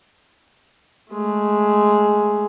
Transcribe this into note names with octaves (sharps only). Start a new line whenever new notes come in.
G#3 A3